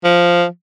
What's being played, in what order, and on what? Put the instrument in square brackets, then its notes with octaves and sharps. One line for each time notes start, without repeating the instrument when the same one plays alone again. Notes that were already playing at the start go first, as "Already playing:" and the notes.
[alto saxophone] F3